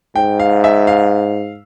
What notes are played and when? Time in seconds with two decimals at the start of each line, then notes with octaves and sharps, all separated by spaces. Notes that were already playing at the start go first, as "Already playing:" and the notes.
0.15 G#2 G5
0.39 F5
0.64 E5
0.87 F5